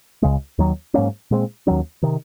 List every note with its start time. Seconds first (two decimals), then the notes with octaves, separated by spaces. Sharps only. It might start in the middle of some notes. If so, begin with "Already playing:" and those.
0.22 C#2 C#3 G#3
0.58 D#2 D#3 F#3
0.94 G#2 F#3 A#3 C#4
1.31 A#2 G#3 C4
1.67 D#2 D#3 F#3 C#4
2.03 C3 D#3